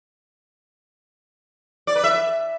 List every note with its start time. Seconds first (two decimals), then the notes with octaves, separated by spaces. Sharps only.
1.87 D5
1.95 B4
2.04 E5